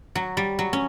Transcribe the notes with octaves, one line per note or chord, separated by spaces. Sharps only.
F#3
G3
F#3
C#4